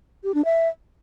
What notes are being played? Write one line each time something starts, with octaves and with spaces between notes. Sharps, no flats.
G4
D4
E5